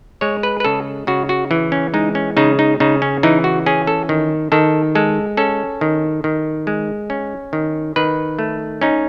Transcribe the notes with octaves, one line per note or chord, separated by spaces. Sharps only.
G#3 C#5
B4
B4
C#3 A4
C#3 F#4
F#4
E3
C#4
G#3 D#4
C#4
C#3 D#4
D#4
C#3 D#4
C#4
E3 D#4
F#4
C#4 G#4
A4
D#3
D#3 A4
G#3 A4
C#4 A4
D#3
D#3
G#3
C#4
D#3
D#3 B4
A3
C#4 D#4